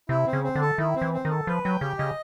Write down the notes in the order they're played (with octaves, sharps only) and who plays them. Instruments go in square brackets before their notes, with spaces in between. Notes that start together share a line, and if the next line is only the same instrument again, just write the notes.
[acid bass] C3 [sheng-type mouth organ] E4
[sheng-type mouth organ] C4
[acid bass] C#3
[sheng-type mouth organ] C4
[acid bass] D3
[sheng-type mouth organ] A4
[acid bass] D#3 [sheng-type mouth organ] E4
[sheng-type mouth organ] C4
[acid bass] E3
[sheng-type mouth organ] C4
[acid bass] D#3 [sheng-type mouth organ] A4
[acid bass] F3 [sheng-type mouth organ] B4
[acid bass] F#3 [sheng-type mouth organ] G5
[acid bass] C#3 [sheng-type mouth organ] G4
[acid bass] C#3 [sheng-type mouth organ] D#5